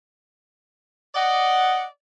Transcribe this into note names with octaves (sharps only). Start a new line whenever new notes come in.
D5 D#5 F#5